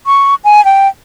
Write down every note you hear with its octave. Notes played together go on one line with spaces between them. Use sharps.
C#6
G#5
G5